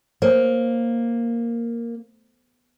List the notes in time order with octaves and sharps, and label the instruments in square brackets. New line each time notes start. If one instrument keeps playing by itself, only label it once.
[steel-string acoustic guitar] A#3 [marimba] C5 C#5